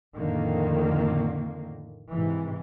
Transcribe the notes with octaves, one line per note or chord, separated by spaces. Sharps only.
F2 A2 D3 D#3 A#3
G#2 C3 E3